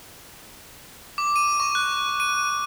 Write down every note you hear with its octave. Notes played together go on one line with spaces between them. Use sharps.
D6
D#7
C#6
F#6
D#7